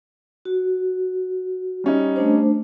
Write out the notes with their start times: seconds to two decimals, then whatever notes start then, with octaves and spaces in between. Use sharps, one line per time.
0.45 F#4
1.84 G3 C#4 D#4
2.16 A3 D4 C5